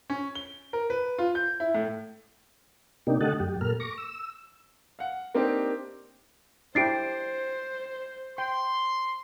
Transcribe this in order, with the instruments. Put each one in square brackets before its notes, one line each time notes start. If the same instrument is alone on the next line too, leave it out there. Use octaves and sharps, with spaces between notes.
[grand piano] C#4
G7
A#4
B4
F4
G6
E4
A2
[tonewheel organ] C3 A#3 D4 D#4 G4
D3 A3 G4 D#5 F#5 A5
F#2 G4
A#2 A4 A#4 F6
C#6 D6 A#6
E6
[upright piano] F5 F#5
A#3 C4 D4 D#4 G4
[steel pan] D4 E4 G4 [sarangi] C5 [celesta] A6 C7 D7
[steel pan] G5 [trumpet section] C6